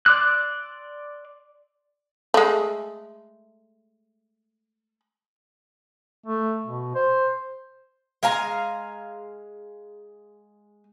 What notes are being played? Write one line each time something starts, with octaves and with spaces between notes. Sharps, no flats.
D5 C6 D6 E6 F#6
G#3 A3
A3
B2
C5
G#3 F5 G#5 A#5